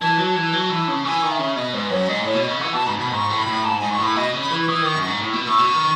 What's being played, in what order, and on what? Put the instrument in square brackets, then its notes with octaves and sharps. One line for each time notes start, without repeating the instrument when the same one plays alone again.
[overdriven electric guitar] E3 [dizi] A5
[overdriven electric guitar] F#3
[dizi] A5
[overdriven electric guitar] E3
F#3
E3
C#3
[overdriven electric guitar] E3 [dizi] G#5
[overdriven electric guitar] D#3
[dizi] E5
[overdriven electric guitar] C#3
[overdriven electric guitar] B2 [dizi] D#5
[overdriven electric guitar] G#2 [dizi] B4
[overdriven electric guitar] F#2 [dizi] C#5
[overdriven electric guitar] G#2 [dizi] D#5
[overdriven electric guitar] A2 [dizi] C#5
[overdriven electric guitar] B2
[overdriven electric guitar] C#3 [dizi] D#5
[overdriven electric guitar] E3 [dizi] F#5
[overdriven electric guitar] B2 [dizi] A5
[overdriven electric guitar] G#2 [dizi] B5
[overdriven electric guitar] B2 [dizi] B5
[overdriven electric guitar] G#2 [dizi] C#6
[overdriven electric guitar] A2
[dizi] B5
[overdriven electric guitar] A2
[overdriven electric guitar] G#2 [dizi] A5
[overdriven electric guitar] G#2 [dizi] G#5
[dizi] C#6
[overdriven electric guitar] A2 [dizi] B5
[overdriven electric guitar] B2 [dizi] D#5
[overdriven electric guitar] C#3
[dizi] B5
[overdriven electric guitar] E3
[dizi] C#6
[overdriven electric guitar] E3 [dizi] D#6
[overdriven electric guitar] D#3 [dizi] C#6
[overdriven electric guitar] F#2
[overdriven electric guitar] G#2 [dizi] C#6
[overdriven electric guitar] A2
B2
[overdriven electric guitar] A2 [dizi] C#6
[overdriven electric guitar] B2
D#3